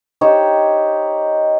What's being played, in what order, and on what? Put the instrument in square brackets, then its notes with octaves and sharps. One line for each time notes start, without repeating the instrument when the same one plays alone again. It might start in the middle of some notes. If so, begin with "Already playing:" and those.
[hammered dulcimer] D#4 G4 C5 C#5